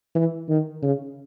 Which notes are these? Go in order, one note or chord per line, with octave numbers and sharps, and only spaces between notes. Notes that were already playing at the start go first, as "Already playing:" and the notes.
E3
D#3
C#3